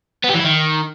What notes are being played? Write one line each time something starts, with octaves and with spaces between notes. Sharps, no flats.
B3
G4
E3
E4
D#3